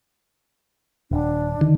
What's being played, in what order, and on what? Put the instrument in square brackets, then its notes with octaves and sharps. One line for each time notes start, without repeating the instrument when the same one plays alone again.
[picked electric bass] D#1 [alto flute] D4
[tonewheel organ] D3 D#3